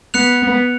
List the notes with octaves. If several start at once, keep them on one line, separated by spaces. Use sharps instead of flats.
B3 F#6 C#7 F7
B3